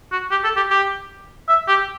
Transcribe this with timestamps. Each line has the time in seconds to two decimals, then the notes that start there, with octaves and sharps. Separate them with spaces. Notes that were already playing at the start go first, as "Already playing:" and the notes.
0.12 F#4
0.31 G4
0.44 A4
0.57 G4
0.70 G4
1.49 E5
1.68 G4